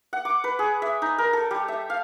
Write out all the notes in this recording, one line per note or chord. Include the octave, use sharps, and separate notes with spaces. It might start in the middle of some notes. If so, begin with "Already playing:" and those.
F#5
D6
B4
G#4
E5
D#4
A#4
A4
G3
E5
F5